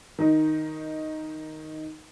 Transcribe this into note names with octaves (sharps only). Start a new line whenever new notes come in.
D#3 D#4